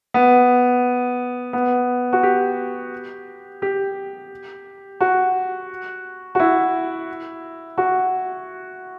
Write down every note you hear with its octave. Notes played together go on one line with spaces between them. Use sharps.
B3
B3
F#4
G4
G4
F#4
F#4
E4
F#4